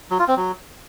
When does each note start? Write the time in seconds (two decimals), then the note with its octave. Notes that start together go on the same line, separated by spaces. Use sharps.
0.11 F#3
0.19 F4
0.28 C4
0.37 F#3